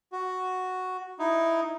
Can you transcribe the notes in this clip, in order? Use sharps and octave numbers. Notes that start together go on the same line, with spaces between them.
F#4
D#4 E4